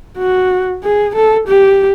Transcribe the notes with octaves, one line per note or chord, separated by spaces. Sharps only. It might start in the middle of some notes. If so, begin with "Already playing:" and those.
F#4
G#4
A4
G4